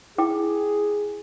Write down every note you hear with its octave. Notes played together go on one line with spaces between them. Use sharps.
E4 G#4 G5 D6